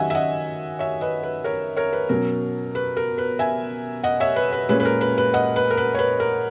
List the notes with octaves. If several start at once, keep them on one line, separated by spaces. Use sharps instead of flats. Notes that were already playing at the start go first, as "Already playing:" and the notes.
Already playing: D#3 F#3 C#4 D#5 E5 F#5 G#5
E5
D#5 F#5
C#5 E5
B4 D#5
B4
A#4 C#5
A#4 C#5
B4
B2 F#3 C#4 A#4
B4
A#4
B4
E5 G#5
D#5 F#5
C#5 E5
B4
B4
A#2 G#3 C#4 B4
B4
A#4
B4
B4
D#5 F#5
B4
A#4
B4
C#5
B4
A#4